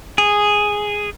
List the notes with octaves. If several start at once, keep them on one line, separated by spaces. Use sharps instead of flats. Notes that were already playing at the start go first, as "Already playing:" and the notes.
G#4